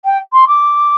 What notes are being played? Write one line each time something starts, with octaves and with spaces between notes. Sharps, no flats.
G5
C6
D6